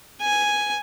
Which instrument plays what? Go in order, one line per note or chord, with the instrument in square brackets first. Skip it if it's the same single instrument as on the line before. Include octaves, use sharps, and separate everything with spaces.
[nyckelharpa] G#5